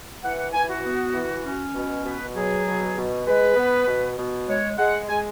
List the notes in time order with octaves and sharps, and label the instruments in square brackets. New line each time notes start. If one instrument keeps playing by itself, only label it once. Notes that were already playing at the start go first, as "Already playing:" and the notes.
[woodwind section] E3 F#5
F#5
E3 G#5
F#4
B3
E3
C#4
B2
B2 B4
F#3 G#4
B2
B2
G#3 B4
B3
B2
B2
G#3 C#5
G#3 F#5
G#3 G#5